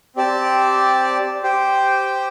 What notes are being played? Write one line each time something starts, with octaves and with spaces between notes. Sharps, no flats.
C4 G4 D5 A5
G4 C5 G5